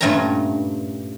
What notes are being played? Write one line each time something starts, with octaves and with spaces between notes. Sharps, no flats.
G2 A#2 A3 C#4 G5 A#5